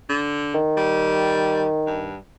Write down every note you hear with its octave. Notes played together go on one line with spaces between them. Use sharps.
D3
D#3
G3
G2